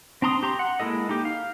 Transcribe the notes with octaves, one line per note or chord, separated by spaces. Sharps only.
C4 D4 A#5 C6 D#6
G4 A#5 C6
F#5
G#3 A#3 E4 A4 D#5
D#4 G4
F5